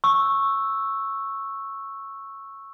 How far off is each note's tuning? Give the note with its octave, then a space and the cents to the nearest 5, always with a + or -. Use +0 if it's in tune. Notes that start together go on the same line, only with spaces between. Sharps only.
C#6 -10 E6 +0